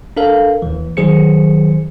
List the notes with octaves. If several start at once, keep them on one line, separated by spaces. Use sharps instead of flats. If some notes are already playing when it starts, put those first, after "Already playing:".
D4 A4 A#4 F5
D#2 E3
D#3 F#3 G#4 C5 C#7